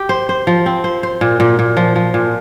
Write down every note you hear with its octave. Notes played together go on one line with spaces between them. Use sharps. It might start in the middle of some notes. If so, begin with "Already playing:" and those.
Already playing: G4
C5
C5
F3
C4
C5
C5
A#2
A#2
A#2
F3
F3
A#2